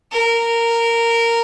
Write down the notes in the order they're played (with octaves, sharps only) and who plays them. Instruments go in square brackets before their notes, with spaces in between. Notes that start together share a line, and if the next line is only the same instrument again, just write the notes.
[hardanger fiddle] A#4